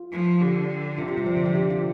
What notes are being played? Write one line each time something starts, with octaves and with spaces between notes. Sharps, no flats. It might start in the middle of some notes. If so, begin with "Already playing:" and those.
Already playing: F4
F3
D3 G4
C3 F4
G4
G3
F3
D3
F3
G4
F4